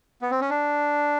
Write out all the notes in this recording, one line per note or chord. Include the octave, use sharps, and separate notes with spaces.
B3
C4
C#4
D4